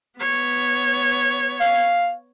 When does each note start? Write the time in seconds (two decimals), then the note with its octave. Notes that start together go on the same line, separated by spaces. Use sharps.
0.20 B3 C#5
1.61 F5